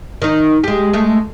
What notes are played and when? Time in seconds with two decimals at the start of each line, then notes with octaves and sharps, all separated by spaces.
0.22 D#3 D#4
0.64 G#3 G4
0.93 G#3 A3